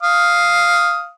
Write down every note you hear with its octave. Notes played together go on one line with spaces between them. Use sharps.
F5 D#6